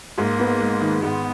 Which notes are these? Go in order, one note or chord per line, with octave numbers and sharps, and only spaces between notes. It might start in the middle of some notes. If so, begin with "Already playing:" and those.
G#2 A#3
B3
G#3
D#3
G#2 B3